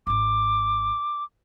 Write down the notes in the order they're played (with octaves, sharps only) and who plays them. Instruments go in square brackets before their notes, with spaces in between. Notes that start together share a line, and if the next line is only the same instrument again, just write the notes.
[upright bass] D1 G#1 [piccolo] D6